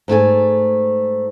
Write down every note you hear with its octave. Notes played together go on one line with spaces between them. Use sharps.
G#2 A3 G#4 G#5